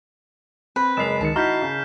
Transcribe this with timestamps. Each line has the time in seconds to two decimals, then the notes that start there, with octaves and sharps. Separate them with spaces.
0.76 C4 B4
0.97 F#1 G#3 C7 E7 F7
1.21 C#2 D#3 A5 C#7
1.36 D#4 E4 F#4 A#5 F6 G6 B6
1.62 C#3